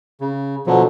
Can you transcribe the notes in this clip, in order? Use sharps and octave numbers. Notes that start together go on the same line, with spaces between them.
C#3
B2 D3 F3 F#3